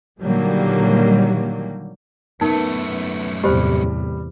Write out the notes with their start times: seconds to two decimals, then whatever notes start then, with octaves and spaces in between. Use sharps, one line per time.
0.19 A#2 D3 D#3 F#3 G3 A#3
2.41 F#2 A3 B3 D#4 A#4
3.44 E2 A2 C3 G3 G4 C5